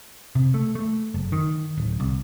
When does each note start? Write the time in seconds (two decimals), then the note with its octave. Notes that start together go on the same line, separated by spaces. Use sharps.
0.35 C3
0.54 A3
0.75 A3
1.14 F#1
1.32 D#3
1.78 D1
2.00 C2